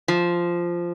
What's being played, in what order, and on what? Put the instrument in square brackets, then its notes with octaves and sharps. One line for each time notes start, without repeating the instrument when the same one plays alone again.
[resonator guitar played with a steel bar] F3